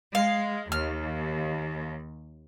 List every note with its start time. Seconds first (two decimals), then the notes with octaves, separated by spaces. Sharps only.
0.15 G#3 F5
0.72 D#2 F6